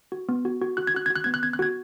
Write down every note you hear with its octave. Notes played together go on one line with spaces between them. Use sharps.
F#4
B3
F#4
F#4
F#4 F#6
G#6
F#4 F#6
F#4 G#6
F#6
B3 G#6
F#6
B3 G#6
F#6
F#4 G#6